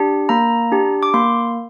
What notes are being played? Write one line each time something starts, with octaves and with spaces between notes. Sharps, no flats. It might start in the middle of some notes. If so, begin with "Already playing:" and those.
Already playing: D4 G4
A#3 A#5
D4 G4
D6
A#3 C6